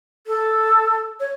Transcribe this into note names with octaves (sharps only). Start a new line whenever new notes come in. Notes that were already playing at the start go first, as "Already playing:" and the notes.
A4
C#5